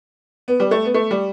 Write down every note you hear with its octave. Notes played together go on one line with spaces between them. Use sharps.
B3
G3
A3
B3
A3
G3